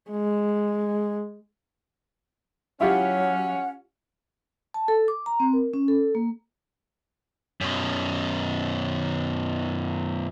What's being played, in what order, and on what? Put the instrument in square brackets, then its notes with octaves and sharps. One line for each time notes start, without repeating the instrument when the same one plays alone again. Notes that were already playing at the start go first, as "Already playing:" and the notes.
[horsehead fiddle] G#3
[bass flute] F#3 [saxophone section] C#4 [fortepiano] E4 F4 G4 [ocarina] F#5
[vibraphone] A5
A4
D6
A#5
C4
A#4
C#4
A4
A#3
[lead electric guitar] F#2 B2